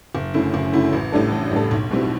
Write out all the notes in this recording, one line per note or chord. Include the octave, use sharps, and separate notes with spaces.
F#1
F#2 D3 A3 E4
F#1
F#2 D3 A3 E4
A1
A2 G3 D4 A4
A1
A2 G3 D4 A4
B1
B2 G3 C4 E4